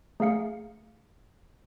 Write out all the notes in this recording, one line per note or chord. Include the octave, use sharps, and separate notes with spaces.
A3 G#4 F5 C#7